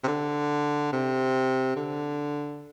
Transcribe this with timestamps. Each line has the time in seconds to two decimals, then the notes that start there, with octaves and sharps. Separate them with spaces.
0.04 C3
0.08 D3
0.92 C3
1.76 D3